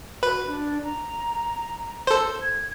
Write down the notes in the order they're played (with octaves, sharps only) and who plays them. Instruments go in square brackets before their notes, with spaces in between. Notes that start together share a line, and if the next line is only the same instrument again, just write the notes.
[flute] F#4 [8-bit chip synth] B4
[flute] D4
A#5
[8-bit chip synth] A4 C5
[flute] G#6